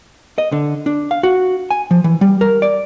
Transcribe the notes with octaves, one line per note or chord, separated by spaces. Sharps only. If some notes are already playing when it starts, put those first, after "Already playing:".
D#5
D3
D4
F5
F#4
G#5
F3
E3
G3
A#4
D5